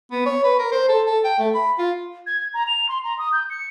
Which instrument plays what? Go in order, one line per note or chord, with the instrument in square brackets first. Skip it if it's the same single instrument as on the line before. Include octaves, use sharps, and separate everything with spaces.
[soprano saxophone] B3
C#5
B4
A#4
C5
A4
A4
G5
A3
B5
F4
[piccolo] G#6
A#5
F7
C6
A#5
D#6
G6
C#7